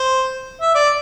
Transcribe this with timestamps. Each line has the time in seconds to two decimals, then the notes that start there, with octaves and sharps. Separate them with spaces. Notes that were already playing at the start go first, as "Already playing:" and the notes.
Already playing: C5
0.61 E5
0.75 D5